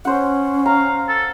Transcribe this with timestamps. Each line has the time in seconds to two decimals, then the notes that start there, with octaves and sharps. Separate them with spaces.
0.05 C#4 C5 F#5
0.66 F5 A#5
1.09 A4